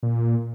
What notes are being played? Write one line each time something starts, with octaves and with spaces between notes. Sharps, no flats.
A#2